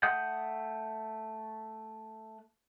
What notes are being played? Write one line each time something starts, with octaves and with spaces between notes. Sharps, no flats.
A3 F#5 D#6 G6